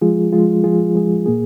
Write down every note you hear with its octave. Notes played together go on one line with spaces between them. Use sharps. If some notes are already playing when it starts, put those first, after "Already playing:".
F3 G#3 F4 G#4
F3 G#3 F4 G#4
F3 G#3 F4 G#4
F3 G#3 F4 G#4
A#2 A#3 G#4